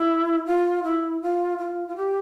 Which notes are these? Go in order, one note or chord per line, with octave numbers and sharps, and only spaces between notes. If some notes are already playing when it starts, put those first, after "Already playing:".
Already playing: E4
F4
E4
F4
F4
F4
G4